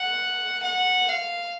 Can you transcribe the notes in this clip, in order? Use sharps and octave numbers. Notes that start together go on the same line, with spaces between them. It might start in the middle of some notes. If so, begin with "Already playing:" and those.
Already playing: F#5
F#5
F5